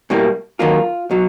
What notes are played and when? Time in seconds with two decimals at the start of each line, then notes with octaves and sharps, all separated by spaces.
0.10 B2 G3 A#3 E4
0.59 D#2 D#3 F#3 A#3 F4
1.11 B2 F#3